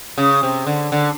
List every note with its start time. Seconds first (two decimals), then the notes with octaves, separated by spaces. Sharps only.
0.18 C#3
0.43 C3
0.67 D3
0.92 D3